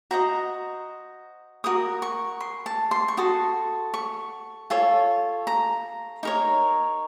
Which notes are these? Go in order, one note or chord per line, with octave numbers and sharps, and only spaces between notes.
F#4 C5 D#5 A#5
F#4 A#4 D#6
C#6
C6
A5
C6
C#6
F#4 A4 D#6
C#6
F4 A4 C#5
A#5
D#4 A#4 C#5